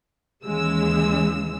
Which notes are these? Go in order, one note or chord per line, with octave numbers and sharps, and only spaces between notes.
D#2 C#3 E3 G#3 E6